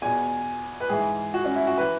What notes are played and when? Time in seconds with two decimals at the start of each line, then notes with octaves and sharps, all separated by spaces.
0.02 E2 B2 G#5
0.80 B4
0.89 G#2 E3 G#4
1.34 F#4
1.45 C#4
1.56 E4
1.67 F#4
1.78 E3 B4